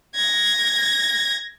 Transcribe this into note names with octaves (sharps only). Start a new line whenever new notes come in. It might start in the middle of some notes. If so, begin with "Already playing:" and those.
G#6 A#6